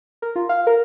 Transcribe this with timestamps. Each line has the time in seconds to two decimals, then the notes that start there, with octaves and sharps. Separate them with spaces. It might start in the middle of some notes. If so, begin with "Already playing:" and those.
0.22 A#4
0.36 F4
0.49 F5
0.67 A#4